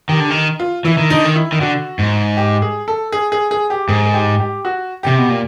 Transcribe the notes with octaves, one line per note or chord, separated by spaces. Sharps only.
D#3 G4
D3
D#3
F4
E3 E4
D#3
D3 D#4
D#3
E4
D#3
D3 F#4
G#2
G4
G#4
A4
G#4
G#4
G#4
G4
G#2 G#4
G#4
G4
G4
F#4
C3 G4
B2
A#2